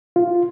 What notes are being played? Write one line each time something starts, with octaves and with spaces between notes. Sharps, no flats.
F4